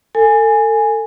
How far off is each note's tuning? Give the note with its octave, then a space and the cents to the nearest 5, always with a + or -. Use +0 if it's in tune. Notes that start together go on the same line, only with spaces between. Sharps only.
A4 +30 G#5 +0